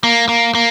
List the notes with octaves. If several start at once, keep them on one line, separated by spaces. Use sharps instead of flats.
A#3
A#3
A#3